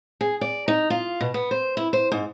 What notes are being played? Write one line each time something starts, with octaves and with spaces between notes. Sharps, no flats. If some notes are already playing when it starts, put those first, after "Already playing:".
G#4
D5
D#4
F4
B2
B3
C5
E4
C5
G#2